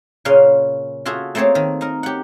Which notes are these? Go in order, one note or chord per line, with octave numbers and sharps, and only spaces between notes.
A#2 C#3 C#4 B4 F5 C6
F4 F#4 G#4 A4 E5
A3 A#3 C4 G#4 C#5 A5
D#3
D#4 A#4
G4 F#5